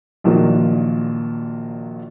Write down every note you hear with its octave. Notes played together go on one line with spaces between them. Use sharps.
A#1 A#2 D#3 F3 F#3 A#3